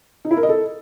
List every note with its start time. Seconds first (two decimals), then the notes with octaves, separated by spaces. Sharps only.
0.25 D#4
0.31 E4
0.37 A#4
0.43 D#5
0.49 A4